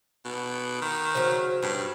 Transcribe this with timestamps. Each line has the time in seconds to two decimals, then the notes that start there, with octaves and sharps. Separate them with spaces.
0.25 B2
0.82 D#3
1.15 C#3 F#3 C5
1.62 G2 C#3